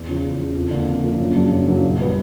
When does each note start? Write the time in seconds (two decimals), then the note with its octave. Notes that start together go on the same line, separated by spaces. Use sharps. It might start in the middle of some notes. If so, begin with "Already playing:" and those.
Already playing: E2
0.08 C#3 F3
0.24 E2
0.40 C#3 F3
0.55 F2
0.71 D3 F3 A#3
0.87 F2
1.03 D3 F3 A#3
1.20 F#2
1.35 C#3 F#3 A#3 D4
1.52 F#2
1.67 C#3 F#3 A#3 D4
1.83 A#1
1.99 A#2 G3 B3